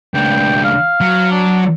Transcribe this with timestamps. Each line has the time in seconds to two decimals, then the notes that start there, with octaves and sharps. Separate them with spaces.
0.14 C#2 D4 G5
0.64 F5
1.01 F#3
1.31 D4